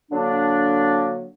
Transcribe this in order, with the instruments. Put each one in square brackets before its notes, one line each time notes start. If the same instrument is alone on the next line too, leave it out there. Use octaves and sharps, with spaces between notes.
[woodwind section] D3 F#3 A#3 D4